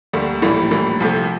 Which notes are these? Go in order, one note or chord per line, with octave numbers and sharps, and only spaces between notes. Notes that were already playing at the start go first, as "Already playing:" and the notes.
D2 D3 G3 A#3
A#1 A2 E3 G3 A#3
A#1 A2 E3 G3 A#3
C2 C3 F3 A3